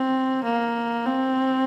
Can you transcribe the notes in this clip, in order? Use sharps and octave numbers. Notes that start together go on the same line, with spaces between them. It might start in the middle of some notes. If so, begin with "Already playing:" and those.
Already playing: C4
A#3
C4